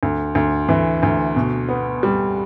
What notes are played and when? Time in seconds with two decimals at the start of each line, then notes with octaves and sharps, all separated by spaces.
0.03 D2
0.35 D2
0.69 E3
1.03 D2
1.36 B2
1.69 B3
2.03 G3